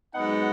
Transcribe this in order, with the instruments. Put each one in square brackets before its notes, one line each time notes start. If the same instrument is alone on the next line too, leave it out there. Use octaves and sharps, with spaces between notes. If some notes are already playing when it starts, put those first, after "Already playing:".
[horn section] G#2 F#3 B3 D#4 F#5